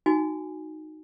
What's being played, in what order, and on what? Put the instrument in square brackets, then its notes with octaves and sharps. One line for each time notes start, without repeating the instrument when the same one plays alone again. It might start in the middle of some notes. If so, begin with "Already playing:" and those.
[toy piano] D#4 F#4 G#5